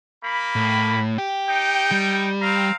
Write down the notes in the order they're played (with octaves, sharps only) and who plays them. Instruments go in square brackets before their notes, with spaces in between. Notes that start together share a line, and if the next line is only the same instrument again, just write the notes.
[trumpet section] A#3 B5
[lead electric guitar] A2
G4
[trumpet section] D#4 G5
[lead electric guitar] G3
[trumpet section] C4 F5 A#5